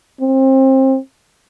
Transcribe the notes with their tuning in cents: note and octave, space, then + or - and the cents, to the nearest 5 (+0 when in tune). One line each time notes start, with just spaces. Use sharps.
C4 +25